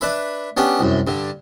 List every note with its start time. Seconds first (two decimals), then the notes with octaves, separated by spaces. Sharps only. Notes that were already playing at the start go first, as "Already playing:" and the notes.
0.01 D4 B4 E5 B5
0.57 B3 C#4 D4 G4
0.79 C2 F#2
1.07 G2 D3